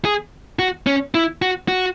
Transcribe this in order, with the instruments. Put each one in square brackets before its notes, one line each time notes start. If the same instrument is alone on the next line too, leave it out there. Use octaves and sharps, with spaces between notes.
[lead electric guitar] G#4
F#4
C#4
E4
F#4
F#4